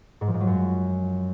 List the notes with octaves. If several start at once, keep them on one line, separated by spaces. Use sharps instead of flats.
G#2
F3
G#2
F#3
F#2